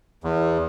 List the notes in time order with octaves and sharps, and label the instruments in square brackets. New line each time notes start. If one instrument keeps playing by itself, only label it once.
[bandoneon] E2